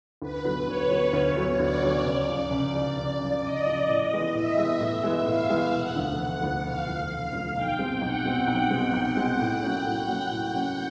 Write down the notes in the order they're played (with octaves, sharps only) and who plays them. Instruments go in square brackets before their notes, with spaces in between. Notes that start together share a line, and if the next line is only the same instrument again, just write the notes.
[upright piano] D2 [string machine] B4
[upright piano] D3 F#3 B3
[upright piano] D2 [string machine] C#5
[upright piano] D3 F#3 B3
D2
D3 F#3 B3
[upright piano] D2 [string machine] D5
[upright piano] D3 F#3 B3
C#2
C#3 F3
C#2
C#3 F3
C#2
C#3 F3
[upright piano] C#2 [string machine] D#5
[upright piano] C#3 F3
A2
E3 G#3 B3
[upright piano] A2 [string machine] E5
[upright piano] E3 G#3 B3
A2
E3 G#3 B3
[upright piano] A2 [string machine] F5
[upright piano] E3 G#3 B3
[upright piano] E1 [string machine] F#5
[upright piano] D2 D3 F3 A3
E1
D2 D3 F3 A3
[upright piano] E1 [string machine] F5
[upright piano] D2 D3 F3 A3
E1
D2 D3 F3 A3
[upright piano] B1 [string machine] G5
[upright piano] B2 G#3 C4
[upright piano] B1 [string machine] F#5
[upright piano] B2 G#3 C4
B1
B2 G#3 C4
B1
B2 G#3 C4
A2
F#3 A#3 C#4
A2
F#3 A#3 C#4
A2
F#3 A#3 C#4